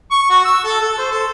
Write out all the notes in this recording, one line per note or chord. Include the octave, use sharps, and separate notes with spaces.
C#6
F#4
E6
A4
A4
C5
A4